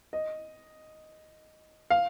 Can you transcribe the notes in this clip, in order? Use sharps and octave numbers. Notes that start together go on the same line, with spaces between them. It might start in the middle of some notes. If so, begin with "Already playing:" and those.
D#5
F5